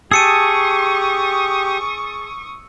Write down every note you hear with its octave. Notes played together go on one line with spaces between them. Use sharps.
G4 G#4 A5 C#6 D#6 E6 C#7 D#7